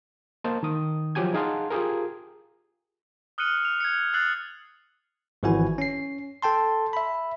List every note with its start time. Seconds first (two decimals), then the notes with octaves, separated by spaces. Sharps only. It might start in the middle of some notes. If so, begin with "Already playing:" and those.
0.44 A#3 C5 D#5 A5
0.63 D#3 D#6
1.15 F3 F#3 G4 G#5 G#6
1.34 D#4 G#4 F5 F#5 A5 C6
1.70 F4 G4 G#4 A#4
3.38 D#6 F6 F#6 C#7 D#7 F#7
3.65 F7
3.80 G#6 C#7
4.13 E6 F#6 A6 C7 F#7
5.43 G#1 E3 F3 E4 F#4 G#5
5.78 C#4 C7
6.42 A4 G5 A5 C6
6.93 E5 B5